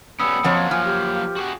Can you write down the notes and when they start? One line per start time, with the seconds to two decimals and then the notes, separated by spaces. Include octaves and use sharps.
0.20 G3 B3 C#4 B5 D#6 E6 C#7
0.44 F2 F3 F#3 A#3 C#5 F#5
0.71 F3 G#5 F6
0.85 G4
1.36 F#4 G#4 F#5